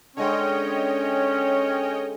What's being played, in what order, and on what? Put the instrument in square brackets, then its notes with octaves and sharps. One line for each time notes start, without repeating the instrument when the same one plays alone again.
[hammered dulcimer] D3 G#3 C5 [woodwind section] C#4 [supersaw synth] C#5 D#5 G5